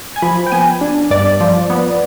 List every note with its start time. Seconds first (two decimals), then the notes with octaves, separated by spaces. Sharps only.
0.16 G#5
0.22 F3 B5
0.47 G5
0.52 B3 G#5
0.81 D4
1.11 G2 D5
1.40 F3
1.70 B3